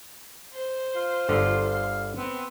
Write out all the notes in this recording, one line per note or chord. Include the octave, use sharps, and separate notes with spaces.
C5
F4
G1 D3 F4
F5
B3 C4